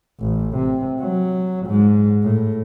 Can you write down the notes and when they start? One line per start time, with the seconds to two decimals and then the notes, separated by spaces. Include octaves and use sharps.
0.20 A1
0.57 C3
1.01 F#3
1.67 G#2
2.23 A2